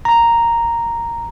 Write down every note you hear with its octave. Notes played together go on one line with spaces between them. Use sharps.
A#5